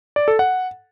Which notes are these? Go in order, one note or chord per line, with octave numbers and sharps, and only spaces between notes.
D5
A4
F#5